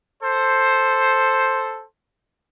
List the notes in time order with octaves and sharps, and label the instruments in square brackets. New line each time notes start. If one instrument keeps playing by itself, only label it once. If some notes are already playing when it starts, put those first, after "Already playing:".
[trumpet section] A4 C5